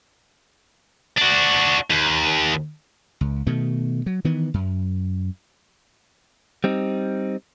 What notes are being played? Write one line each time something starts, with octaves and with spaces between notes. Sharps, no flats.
D4 F#4
D#2
C#2
B2 D#3 A3
F#3
D#3 E3 B3
F#2
G3 C4 D#4